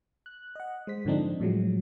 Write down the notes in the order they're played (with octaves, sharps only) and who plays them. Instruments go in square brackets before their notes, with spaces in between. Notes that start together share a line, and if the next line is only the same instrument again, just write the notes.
[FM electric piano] F#6
D#5 F#5
G#3 C5 B6
G#2 D3 F3 C4 D4 D#4
A2 F3 F#3 G#3